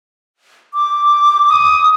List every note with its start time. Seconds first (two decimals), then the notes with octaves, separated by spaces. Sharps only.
0.74 D6
1.49 D#6